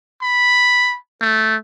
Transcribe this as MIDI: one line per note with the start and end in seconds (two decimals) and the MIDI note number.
0.22 0.97 83
1.21 1.56 57